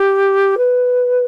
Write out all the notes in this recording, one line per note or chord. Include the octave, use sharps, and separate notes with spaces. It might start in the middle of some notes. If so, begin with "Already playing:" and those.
Already playing: G4
B4